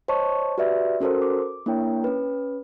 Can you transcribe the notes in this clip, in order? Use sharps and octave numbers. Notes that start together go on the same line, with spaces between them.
C5 C#5 D#5 A5 C#6
F#4 G4 B4 D5 E5
C#4 F#4 A4 A#4 C5
D6
A#3 D4 E4 A#4 C#5 G5
C#4 B4